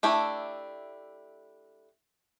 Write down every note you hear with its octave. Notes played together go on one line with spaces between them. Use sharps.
A3 D4 E4 G4